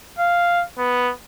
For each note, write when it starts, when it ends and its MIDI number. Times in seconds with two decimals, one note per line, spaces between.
0.19 0.62 77
0.78 1.11 59